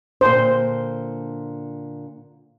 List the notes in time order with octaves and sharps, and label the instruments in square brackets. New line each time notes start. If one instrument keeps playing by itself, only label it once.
[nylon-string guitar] A#2 D3 D4 [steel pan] C5